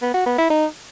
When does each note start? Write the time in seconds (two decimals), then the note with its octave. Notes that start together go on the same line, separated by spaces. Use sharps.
0.02 B3
0.14 F#4
0.26 B3
0.38 E4
0.50 D#4